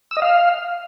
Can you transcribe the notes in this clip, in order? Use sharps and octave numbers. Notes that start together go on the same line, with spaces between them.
E6
D#5
F5